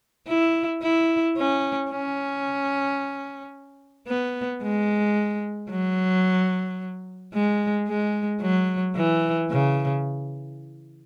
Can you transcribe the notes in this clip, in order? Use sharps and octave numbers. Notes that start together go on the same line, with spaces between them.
E4
E4
C#4
C#4
B3
G#3
F#3
G#3
G#3
F#3
E3
C#3